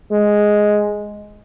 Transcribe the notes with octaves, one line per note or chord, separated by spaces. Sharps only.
G#3